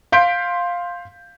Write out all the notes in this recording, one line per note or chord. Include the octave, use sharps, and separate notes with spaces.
F5 C6 G6 B6 D7